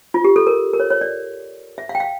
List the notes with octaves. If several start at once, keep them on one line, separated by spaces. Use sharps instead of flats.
F4
G4
A4
A#4
A#4
C#5
C#5
D5
E5
F5
G5
F5